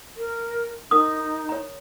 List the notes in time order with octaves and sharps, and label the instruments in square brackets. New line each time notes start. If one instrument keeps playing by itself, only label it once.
[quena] A#4
[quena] D#4 [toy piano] A#4 D#6
[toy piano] C#5 A#5